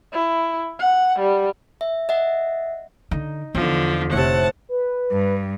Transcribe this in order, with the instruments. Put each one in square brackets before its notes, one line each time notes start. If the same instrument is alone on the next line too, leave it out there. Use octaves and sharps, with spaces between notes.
[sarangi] E4
F#5
G3
[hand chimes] E5
D#5 E5 F#5
[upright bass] D3 [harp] D#4
[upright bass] E2 [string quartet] D3 F3
[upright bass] F1 [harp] A2 C3 [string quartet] F#5 A5
[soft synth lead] B4
[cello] G2